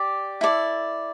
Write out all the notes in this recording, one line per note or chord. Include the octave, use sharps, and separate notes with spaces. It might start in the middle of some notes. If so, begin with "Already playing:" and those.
Already playing: G4 D5
E4 A4 D5